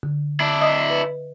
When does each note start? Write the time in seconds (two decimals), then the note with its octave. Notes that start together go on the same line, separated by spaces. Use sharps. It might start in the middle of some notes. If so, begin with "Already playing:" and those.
0.03 D3
0.40 D4 E4
0.61 D#5 E5 D#6
0.90 B4